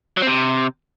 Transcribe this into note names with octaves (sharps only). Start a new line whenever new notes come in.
F#3
C4
C3